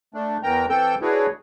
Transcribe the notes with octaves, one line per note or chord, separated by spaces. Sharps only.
A3 D4
E2 E3 A#4 G5 A#5
E3 C4 A4 G5 E6 G6
D4 E4 F#4 G#4 B4 C#5